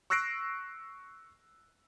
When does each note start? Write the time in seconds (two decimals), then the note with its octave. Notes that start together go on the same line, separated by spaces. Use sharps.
0.10 C#6 E6 F#6 A#6 C7 D7